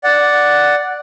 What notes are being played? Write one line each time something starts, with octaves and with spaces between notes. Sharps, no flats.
D5 F#5